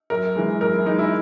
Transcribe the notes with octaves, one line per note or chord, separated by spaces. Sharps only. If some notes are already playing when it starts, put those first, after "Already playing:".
F#2 A#4
E3 G#3
F#2 A#4
E4
E3 G#3 D#4
E4